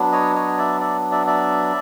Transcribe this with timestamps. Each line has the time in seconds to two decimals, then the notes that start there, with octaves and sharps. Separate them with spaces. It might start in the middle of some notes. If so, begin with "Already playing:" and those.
Already playing: F#3 B3 D4
0.12 C#5 D#5
0.35 C#5 D#5
0.58 D5 E5
0.81 D5 E5
1.11 D5 E5
1.27 D5 E5